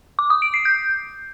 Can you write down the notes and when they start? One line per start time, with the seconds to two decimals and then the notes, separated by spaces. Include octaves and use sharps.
0.19 D6
0.30 D#6
0.42 D7
0.54 C7
0.65 G6